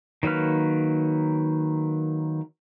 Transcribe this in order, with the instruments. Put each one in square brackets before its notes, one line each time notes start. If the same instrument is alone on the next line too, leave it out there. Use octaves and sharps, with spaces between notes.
[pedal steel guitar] D#3 F#3 A#3 B4 F6